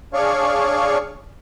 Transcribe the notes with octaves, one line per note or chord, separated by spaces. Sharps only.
D4 G#4 C#5 D5 F5 C#6